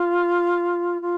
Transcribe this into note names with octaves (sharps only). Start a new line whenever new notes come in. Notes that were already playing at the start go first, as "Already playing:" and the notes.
Already playing: F4
F4